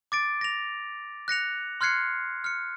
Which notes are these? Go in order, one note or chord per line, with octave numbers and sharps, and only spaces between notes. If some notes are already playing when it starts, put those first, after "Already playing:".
D6 A6 D7
A#6 F7
F#6 A#6 C#7 F7
C6 F6 F#6 G#6 C7 C#7
F6 C#7